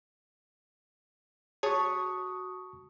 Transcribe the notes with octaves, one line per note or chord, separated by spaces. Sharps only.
F#4 G#4 C#5 A5 C#6 D#6